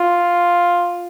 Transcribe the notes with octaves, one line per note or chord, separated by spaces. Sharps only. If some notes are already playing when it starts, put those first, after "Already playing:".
Already playing: F4